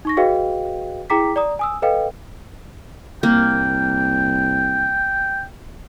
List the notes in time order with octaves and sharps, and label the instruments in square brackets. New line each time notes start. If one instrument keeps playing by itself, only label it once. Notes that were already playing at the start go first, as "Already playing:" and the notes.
[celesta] D#4 C#6 A#6
F#4 G#4 B4 D#5 F5 G5
E4 G#4 G5 A#5 D6 B6
D5 A#5 D#6
G#5 D#6 E6
A4 B4 D#5 F5 G5
[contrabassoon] C2 [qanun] A#3 [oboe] G5